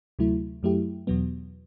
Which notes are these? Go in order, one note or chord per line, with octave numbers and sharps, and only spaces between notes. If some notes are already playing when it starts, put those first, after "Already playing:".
D2 C3 F#3 A3 E4
F#2 F#3 A3 E4 G4
E2 B2 F#3 B3